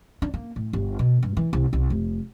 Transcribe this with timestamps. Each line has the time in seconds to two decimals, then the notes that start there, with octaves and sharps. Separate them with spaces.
0.22 D4
0.34 A#3
0.56 A2
0.73 G1
0.99 B2
1.23 G2
1.37 E3
1.53 C2
1.73 C2
1.90 F1